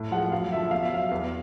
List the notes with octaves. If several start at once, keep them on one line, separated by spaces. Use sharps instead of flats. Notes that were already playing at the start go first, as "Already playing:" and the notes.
Already playing: A2
F3 G#3 F#5
F#2 F5
D3 F3 E5
B2 F5
E5
F#3 F5
E2